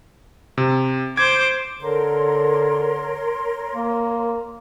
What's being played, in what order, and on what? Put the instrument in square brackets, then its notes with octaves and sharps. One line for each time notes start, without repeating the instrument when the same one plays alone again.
[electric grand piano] C3
[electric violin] C5 D6 [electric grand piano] G#6
[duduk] D3 [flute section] A#4 C#5 C6
[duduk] A#3